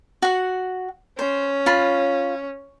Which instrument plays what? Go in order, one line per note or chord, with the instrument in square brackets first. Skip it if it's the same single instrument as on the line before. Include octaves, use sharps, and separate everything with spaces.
[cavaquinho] F#4 F#5
[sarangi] C#4 [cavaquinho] C5
[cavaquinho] F4 B5